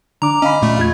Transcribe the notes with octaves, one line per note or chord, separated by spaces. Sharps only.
D3 D4 A#5 D6
C#4 D#5 F5 B5
A#2 A3
E2 F4 G#6